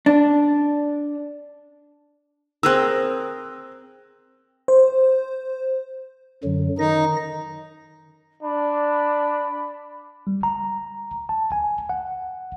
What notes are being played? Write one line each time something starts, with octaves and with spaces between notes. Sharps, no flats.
D4
C4 G#4 A#4 E6 F#6
C5
F#2 D3 F#3
D#3 D#4 A#6
D4 B5
G3
A#5
A5
G#5
F#5